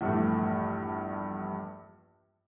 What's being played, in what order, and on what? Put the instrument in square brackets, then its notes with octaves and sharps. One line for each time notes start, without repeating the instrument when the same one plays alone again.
[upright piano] A#1 E2 G2 E3 A3